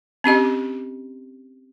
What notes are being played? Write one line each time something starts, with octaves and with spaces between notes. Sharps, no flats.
C4 C#4 G4 D#5